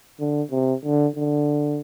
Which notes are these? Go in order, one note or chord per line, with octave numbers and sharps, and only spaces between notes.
D3
C3
D3
D3